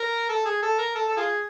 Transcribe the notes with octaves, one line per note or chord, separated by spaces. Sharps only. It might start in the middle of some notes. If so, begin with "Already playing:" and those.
Already playing: A#4
A4
G#4
A4
A#4
A4
A4
F4 G#4